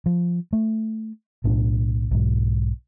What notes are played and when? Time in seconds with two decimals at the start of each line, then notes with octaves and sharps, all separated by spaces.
0.06 F3
0.53 A3
1.44 B1 A2 D4
2.11 B1 G#2